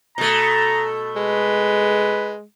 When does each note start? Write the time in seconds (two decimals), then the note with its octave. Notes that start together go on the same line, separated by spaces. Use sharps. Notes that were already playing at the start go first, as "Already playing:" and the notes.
0.18 B2 A3 A#5
1.16 G#3 B4